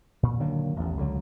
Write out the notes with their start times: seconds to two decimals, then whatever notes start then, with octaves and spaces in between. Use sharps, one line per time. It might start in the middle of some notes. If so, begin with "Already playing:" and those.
0.23 A#2
0.40 D3 D#3 F#3 A#3
0.76 A1 E2
0.97 C#2 D3 F#3